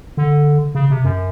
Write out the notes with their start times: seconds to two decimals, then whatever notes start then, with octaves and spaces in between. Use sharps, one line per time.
0.17 D3
0.75 C#3
0.90 C3
1.04 F#2